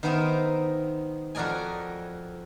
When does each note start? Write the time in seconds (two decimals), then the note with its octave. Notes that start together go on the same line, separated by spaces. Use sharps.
0.03 D#3 B3 D#4 A#4 C5 E5
1.35 F2 F#4 A#4 D5 D#5 G#5